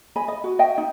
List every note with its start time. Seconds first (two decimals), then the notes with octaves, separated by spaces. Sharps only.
0.16 D#5 G#5 B5
0.28 D#5
0.44 F#4
0.59 D#5 E5 G5
0.78 D#4